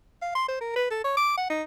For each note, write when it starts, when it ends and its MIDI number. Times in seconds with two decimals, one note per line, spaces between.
0.22 0.33 77
0.35 0.45 84
0.48 0.57 72
0.61 0.73 70
0.76 0.86 71
0.91 0.99 69
1.04 1.14 73
1.17 1.37 86
1.37 1.47 78
1.49 1.63 63